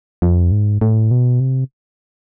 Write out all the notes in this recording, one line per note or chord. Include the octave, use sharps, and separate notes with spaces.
F2
G#2
A2
B2
C3